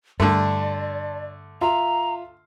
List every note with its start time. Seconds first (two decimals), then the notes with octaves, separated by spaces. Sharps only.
0.20 G2 D3 A3 D5 A5 C6
1.61 F4 E5 A#5 C6